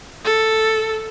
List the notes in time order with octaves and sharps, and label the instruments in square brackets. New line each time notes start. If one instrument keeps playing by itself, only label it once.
[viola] A4